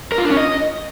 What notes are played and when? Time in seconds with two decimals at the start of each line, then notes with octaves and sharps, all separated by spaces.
0.12 A#4
0.18 F4
0.24 D4
0.31 C#4
0.37 D#5